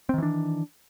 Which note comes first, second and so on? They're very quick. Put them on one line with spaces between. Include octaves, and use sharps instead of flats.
C4 D#3 E3 D4